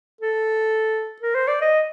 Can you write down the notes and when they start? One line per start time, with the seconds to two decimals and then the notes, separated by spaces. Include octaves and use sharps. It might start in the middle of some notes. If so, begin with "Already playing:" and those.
0.21 A4
1.22 A#4
1.35 C5
1.48 D5
1.62 D#5